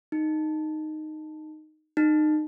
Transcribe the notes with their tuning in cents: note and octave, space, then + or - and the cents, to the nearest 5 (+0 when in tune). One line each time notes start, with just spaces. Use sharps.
D#4 -5
D#4 -30